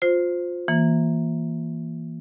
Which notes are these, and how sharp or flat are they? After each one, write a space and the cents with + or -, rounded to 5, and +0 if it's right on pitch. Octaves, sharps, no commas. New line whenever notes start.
F4 +20 C5 -5
E3 +0 A#3 +0